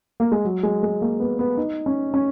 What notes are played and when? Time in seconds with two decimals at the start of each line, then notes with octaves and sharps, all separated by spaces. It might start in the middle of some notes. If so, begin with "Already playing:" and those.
0.20 A#3
0.32 G#3
0.45 F#3
0.63 G#3
0.83 G#3
1.01 A#3
1.20 B3
1.39 B3
1.57 D#4
1.86 C#4
2.14 C#4